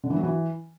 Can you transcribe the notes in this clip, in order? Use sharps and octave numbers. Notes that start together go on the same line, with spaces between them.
D3
E3
F#3
E3